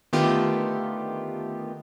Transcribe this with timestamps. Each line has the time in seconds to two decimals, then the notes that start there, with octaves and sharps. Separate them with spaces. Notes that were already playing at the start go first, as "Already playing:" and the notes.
0.13 D3 D#3 A3 B3 F4 G4